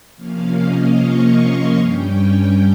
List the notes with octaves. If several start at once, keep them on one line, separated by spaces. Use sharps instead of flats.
C3 F3 A#3 C#4 F5
D#5
C#6
C6
G2 G3 C#4 G5